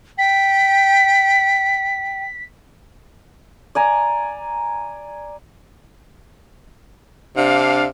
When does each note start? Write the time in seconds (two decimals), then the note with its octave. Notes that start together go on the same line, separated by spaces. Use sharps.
0.18 G5 B6
3.75 D5 G#5 A#5
7.36 C3 D4 F5